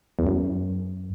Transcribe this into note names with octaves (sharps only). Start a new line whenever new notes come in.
E2
F#2